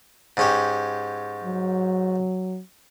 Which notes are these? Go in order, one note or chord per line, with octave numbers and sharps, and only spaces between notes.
G#2 C#4 G4
F#3